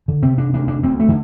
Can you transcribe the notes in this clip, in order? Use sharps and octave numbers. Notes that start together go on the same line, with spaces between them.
D3
C3 C4
D4
D2 D4
D4
D2 C4
A3
D3